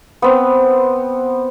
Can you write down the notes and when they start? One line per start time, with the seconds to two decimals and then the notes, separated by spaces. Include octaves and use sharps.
0.22 B3 C4